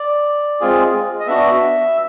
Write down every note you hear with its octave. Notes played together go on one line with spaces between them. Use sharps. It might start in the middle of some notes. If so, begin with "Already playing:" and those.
Already playing: D5
G#3 C4 F4 G#4
D#5
B3 D4 F#4 E5